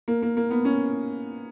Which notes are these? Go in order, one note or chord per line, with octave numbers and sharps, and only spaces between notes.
A#3
A#3
A#3
B3
C#4